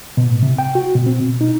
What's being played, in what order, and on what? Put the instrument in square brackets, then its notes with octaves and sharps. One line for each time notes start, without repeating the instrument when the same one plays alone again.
[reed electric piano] B2
A2
C3
G5
F#4
B2
C4
B2
D#4